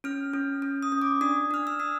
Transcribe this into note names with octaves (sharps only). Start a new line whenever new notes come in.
C#4 F6
C#4
C#4
D#6
C#4
D6
D4 D#6
D4 F6
E6
D4 D#6